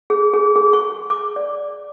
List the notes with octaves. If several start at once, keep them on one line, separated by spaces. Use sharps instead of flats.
G#4
G#4
G#4
C#6
D6
D5